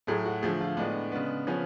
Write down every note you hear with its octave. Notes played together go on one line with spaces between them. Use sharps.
A2 F#3 A3 G#4
F#4
D3 F3 A3 G#4
F4
A2 G#3 B3 D4
C#3 G#3 B3
C#3 F3 B3 C#4